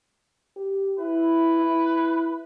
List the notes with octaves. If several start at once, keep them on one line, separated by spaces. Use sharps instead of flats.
G4
E4 B4
E4